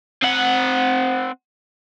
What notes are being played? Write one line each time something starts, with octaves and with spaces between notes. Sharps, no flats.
C4 F#5